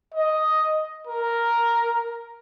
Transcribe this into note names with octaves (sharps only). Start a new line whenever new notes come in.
D#5
A#4